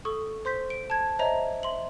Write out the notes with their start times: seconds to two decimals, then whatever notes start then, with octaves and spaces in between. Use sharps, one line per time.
0.05 A4 C#6 D#6
0.45 C5 C6 G6 B6
0.70 D7
0.90 A5 G#6
1.19 C5 C#5 D#5 E5 A#5
1.63 E5 C6 F#7